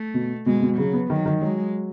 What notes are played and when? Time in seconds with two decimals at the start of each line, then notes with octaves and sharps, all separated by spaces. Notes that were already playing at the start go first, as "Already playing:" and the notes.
Already playing: A3
0.14 B2
0.46 B2 G#3
0.62 B2
0.78 C#3 F#3
0.93 B3
1.10 D#3 F#3
1.26 D#3
1.41 F#3 G#3